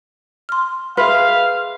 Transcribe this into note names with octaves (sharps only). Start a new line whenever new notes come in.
C6 F6
G#4 B4 E5 F5 C6